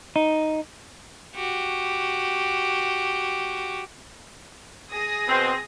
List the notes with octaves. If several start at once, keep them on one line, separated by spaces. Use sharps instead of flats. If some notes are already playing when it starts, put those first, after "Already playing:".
D#4
F#4 G4
G#4 D#6 A#6
B2 C4